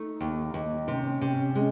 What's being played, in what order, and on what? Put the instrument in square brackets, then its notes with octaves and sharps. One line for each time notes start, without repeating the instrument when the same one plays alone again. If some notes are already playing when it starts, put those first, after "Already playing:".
Already playing: [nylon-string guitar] A3 [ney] D#4
[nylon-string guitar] D#2
D#2
[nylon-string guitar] C3 [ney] C#4 D#4
[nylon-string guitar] C3
G#3